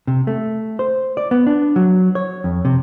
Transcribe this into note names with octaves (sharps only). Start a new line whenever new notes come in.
C3
A3
C5
D5
B3
D4
F#3
C#5
F2
C3